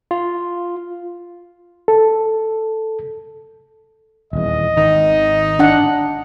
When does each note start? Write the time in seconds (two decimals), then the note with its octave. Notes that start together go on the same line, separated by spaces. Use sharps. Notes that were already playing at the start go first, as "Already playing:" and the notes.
0.11 F4
1.88 A4
4.33 D#1 E2 D#5
4.77 G#1 D#3 D#4
5.59 D4 F#5